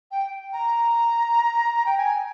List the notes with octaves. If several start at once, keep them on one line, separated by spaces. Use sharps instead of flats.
G5
A#5
G5
G#5